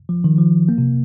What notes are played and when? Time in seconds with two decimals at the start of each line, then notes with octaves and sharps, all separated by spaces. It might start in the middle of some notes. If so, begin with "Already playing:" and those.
0.09 F3
0.24 D#3
0.38 F3
0.69 A#3
0.78 C3